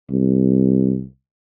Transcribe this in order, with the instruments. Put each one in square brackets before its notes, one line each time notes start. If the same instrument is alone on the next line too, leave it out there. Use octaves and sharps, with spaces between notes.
[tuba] C2